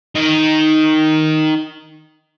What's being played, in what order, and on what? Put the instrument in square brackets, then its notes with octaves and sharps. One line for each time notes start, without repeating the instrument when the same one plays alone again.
[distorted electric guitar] D#3 D#5